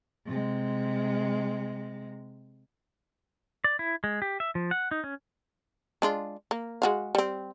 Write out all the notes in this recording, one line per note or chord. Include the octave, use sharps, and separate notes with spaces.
C3 G#3
D5
E4
G#3
G4
E5
F3
F#5
D#4
C#4
G#3 D4 F4
A#3
G#3 F#4 F5
G3 C4